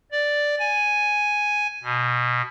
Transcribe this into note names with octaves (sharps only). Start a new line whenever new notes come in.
D5
G#5
B2